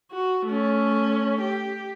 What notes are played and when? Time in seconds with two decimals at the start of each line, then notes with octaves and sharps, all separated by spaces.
0.12 F#4
0.47 A3 C#4
1.41 G4